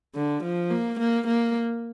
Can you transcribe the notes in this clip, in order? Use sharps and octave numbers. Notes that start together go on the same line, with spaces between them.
D3
F3
A#3
A#3
A#3